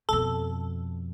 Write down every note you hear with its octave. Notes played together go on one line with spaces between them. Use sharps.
F2 B2 A4